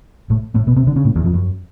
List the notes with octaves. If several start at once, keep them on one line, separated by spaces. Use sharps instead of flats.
A2 A3
A2 A3
B2 B3
C3 C4
D3 D4
C#3 C#4
A2 A3
E2 E3
F2 F3
F#2 F#3